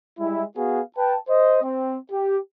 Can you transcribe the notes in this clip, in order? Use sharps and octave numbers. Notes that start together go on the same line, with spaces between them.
G3 G#3 E4
B3 F#4 G#4 F5
B4 G5 A5
C5 D#5
C4
G4